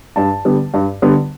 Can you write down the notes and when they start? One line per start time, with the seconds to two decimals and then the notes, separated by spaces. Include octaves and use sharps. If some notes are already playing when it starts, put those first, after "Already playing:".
0.16 G2 A5
0.45 D3 G3 B3
0.74 G2
1.02 D3 G3 B3